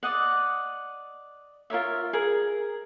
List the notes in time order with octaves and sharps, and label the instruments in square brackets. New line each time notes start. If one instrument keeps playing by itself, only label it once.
[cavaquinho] D5 D#5 F#5
F4 A#4 C#5 E5
G#4 A#4